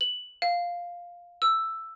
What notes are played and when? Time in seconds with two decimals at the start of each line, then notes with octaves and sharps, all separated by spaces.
0.01 F#7
0.42 F5
1.42 E6